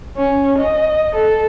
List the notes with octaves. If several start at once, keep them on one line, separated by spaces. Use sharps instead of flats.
C#4
D#5
A4